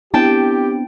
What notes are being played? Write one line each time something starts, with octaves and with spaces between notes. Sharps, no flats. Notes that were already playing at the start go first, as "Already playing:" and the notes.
B3 C4 D4 E4 G4 G5 A5